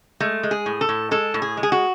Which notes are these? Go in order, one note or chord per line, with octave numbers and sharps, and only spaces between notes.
G#3 A3
G#3
G#4
A2
A4
A2
G#3 A4
A2
G#4
G#3
G#4
F#4